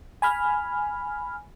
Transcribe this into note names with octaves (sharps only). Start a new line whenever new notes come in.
G#5 B5 F6